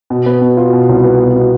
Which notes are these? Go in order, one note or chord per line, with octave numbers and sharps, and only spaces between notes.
B2
B3
B2
F4
B2
C2
B3
B2
B2